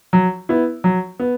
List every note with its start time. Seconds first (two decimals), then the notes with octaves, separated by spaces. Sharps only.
0.13 F#3
0.49 B3 E4
0.84 F#3
1.19 B3